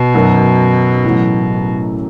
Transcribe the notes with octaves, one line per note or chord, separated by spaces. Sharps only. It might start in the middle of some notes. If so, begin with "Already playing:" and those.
Already playing: B2
F#2 D#3 F#3
A1 A2 F#3